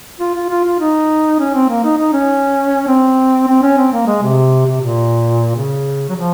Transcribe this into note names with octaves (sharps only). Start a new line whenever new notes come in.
F4
F4
F4
F4
D#4
C#4
C4
A#3
D#4
D#4
C#4
C4
C4
C#4
C4
A#3
G#3
C3
C3
A#2
C#3
F#3
F3